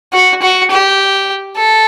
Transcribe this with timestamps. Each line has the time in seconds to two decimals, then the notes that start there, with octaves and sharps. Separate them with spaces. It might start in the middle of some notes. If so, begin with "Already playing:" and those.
0.13 F#4
0.42 F#4
0.71 G4
1.57 A4